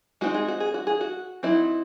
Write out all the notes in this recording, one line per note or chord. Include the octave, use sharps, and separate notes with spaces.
G#3 C4 D#4 F#4
G#4
F#4
G#4
F#4
G#4
F#4
F#3 C4 D#4 E4